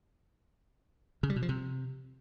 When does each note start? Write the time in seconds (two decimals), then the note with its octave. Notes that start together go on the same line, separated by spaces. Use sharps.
1.23 C#3
1.30 G3
1.36 B2
1.42 F3
1.49 C3